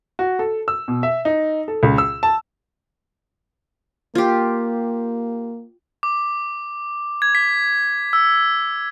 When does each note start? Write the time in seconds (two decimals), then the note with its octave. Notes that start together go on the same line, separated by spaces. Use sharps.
0.19 F#4
0.39 A4
0.68 E6
0.88 B2
1.03 E5
1.25 D#4
1.68 A4
1.83 C#2
1.98 E6
2.23 A5
4.15 A#3 F4 G4
6.03 D6
7.22 G#6
7.35 B6
8.13 E6